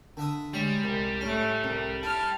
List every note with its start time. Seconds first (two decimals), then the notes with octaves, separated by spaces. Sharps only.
0.17 D3 E5 D#6
0.53 G3 G#3 C#5
0.84 C2
1.21 A2 A3 C#4
1.64 C2
2.03 E4 A5 F6